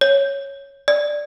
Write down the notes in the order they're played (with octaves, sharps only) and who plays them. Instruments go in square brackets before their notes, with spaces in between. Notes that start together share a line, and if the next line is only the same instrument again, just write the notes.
[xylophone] C#5
D5